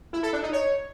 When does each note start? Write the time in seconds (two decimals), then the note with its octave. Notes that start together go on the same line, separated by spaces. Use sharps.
0.13 E4
0.23 A4
0.33 D4
0.43 D#4
0.53 C#5